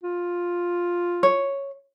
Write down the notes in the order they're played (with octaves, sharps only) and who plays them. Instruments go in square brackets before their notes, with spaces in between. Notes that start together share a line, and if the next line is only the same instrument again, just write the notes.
[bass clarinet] F4
[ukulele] C#5